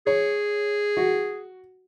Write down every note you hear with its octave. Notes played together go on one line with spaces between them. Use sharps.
G#4 C#5
F#4